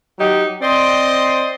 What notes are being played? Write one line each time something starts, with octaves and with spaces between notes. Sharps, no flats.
F#3 D#4 G4
C4 C5 D5 D#5